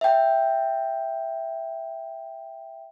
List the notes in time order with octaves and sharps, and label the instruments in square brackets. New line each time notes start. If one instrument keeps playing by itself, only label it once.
[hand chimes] E5 G5